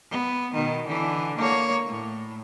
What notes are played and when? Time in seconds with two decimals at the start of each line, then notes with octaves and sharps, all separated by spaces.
0.10 B3
0.55 B2 D#3
0.87 D3 E3
1.37 A#3 C#5
1.87 A2